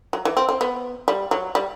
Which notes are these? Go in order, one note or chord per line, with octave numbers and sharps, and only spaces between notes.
F#3
E3
C4
C4
B3
G3
F#3
G3